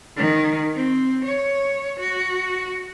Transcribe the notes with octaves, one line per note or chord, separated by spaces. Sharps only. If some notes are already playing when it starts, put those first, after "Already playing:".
D#3
C4
C#5
F#4